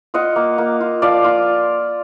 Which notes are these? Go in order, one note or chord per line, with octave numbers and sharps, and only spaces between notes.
F4 D#5 F#5
A#3
A#3
F4
F3 D5 F5
F4